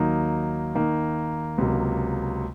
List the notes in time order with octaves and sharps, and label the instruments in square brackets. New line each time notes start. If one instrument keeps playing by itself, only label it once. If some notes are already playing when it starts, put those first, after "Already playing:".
Already playing: [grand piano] D#2 D#3 F#3 A#3 D#4
D#2 D#3 A#3 D#4
C#2 C3 F#3 A#3